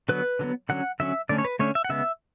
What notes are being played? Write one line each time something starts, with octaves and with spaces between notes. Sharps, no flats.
D3 F#3 B3 B4
D3 F#3 B3
D3 F#3 C#4 F#5
D3 F#3 C#4 E5
D3 A3 C#4 D5
C#5
B4
D3 A3 C#4 C#5
E5
F#5
C#3 G#3 B3 E5